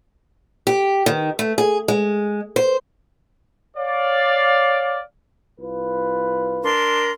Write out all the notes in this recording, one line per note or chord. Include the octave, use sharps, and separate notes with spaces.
G4
D#3
A3
G#4
G#3
C5
C#5 D5 F5
C2 F4 B4
D4 A#4 C6